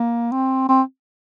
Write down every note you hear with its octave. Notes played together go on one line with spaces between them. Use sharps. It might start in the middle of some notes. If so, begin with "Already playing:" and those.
Already playing: A#3
C4
C4